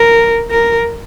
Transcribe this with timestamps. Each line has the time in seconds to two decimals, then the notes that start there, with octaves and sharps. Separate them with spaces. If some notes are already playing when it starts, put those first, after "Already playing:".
Already playing: A#4
0.51 A#4